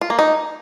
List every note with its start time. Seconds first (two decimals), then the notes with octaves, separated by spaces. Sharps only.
0.01 F4
0.10 A#3
0.19 D#4